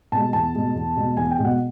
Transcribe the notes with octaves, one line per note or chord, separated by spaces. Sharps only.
B2 G#3 A5
E2 A5
B2 G#3
E2
B2 G#3
E2 G#5
G5
B2 G#3
F#5